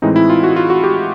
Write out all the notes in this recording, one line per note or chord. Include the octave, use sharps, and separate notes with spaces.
A2 E3 G#3 C4 D#4
E4
F4
F#4
F4
F#4
G4